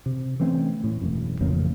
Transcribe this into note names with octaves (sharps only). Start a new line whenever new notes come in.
C3
E3 A3 C4 C#4
A2
E1 F#2
A1 F2 C#3 A#3